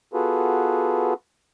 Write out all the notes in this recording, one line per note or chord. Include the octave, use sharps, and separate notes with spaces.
B3 F4 F#4 G#4 A4 B4